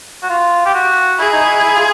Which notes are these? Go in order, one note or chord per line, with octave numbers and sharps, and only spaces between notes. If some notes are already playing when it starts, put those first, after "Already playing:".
F#4
F4
G4
F#4
E4 G#4
D#4
E4
E4
F4